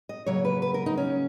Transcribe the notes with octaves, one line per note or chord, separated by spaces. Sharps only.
D#5
C#3 F#3 A#3 C#5
B4
B4
A#4
D#4
C#4